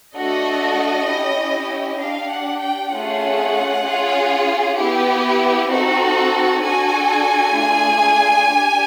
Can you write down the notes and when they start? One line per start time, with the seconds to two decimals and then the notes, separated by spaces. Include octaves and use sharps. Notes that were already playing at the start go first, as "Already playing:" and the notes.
0.15 A3 D4 F#4 A4 D#5
1.07 C#4 E4 G4
1.99 D4 G4 F5
2.30 F#5
2.61 G5
2.92 A3 C#4 F4 G#4 F#5
3.84 C#4 F4 G#4
4.76 B3 E4 G4
5.69 C4 D#4 F#4 A4
6.61 D4 F#4 A4 G#5
7.54 A3 D4 F4 G#4
8.46 D4 G4